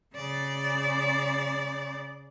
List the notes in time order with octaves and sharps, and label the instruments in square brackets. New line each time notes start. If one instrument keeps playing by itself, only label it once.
[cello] C#3 D5